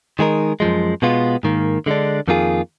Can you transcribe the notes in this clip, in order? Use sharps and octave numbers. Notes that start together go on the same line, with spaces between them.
D#3 G#3 D#4 A#4
F#2 F3 G#3
B2 G#3 B3 F4
G#2 D#3 A#3
D3 G#3 D4
F2 D#3 A#3 F4 G#4